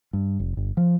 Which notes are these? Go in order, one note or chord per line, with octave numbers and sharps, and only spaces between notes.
G2
F1
G1
F3